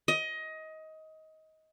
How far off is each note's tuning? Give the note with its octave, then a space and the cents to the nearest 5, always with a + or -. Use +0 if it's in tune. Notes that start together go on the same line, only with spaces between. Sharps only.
D#5 +20